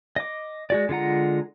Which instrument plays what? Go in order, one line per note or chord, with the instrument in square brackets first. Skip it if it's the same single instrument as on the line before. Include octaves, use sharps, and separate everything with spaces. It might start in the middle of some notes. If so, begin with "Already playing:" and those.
[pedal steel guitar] D#5 D6
G#3 F#4 D5
D3 G#3 F4 F#5 A#5